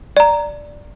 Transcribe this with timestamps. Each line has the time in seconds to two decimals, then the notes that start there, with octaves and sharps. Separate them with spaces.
0.17 D5 A#5